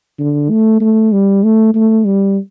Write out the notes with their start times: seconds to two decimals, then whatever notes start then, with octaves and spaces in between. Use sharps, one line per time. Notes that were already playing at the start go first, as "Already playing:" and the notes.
0.19 D3
0.50 A3
0.80 A3
1.12 G3
1.44 A3
1.75 A3
2.05 G3